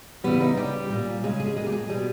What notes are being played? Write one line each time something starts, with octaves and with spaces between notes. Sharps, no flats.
C#3 E3 G3 B3
D#4
C#3 G3 G4
A#2 G3
C#3 G#3 G#4
G#4
A#2 G#3 G#4
G4
G#4
B2 G3 G#4